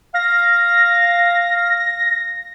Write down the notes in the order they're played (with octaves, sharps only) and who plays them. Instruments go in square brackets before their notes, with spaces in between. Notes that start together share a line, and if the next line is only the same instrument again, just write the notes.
[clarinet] F5 [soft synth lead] A#6